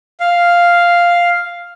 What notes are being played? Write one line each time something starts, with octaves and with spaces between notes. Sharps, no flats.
F5